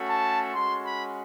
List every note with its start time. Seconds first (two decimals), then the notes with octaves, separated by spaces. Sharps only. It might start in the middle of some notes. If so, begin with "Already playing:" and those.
Already playing: A3 C#4 F#4
0.09 A5
0.54 G#3 C#4 F#4 C6
0.84 B5